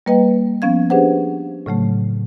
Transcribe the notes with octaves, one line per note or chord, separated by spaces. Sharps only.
G3 A#3 B4 D#5 G5
F3 B3 C#4 F5 G#6
D4 G4 G#4 B4 C5 F#5
A2 C#3 F#3 A3